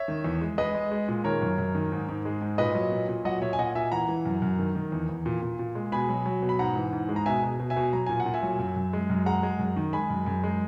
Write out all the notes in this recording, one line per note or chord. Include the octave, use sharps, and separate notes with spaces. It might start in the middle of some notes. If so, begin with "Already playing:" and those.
Already playing: C#5 E5
D#3
E2
G#3
G#3 B4 D#5
G#3
G#3
A#2
D#3 A#4 C#5
F#2
F#2
D#3
G#2
G#2
G#3
G#2
A#2 B4 D#5
F#3
A#2
A#2
F#3 D#5 F#5
A#2 C#5 E5
G#5
A#2 D#5 F#5
A#2 E5 G#5
E3 F#5 A#5
E3
F#2
F#2
D#3
D#3
E2
E2
A#2
A#2
A#2
G#3
B2 G#5 B5
F#3
F#3
B2
B5
G#2 F#5 A#5
E3
G#2
G#3
A#5
B2 E5 G#5
B2
B2
E5 G#5
B2
F#3 A#5
A#2 G#5
F#5
A#2
E5 G#5
F#3
F#2
F#2
G#3
F#2
G#3 F#5 A#5
G#3
F#2
D#3
G#3 G#5 B5
F#2
F#2
G#3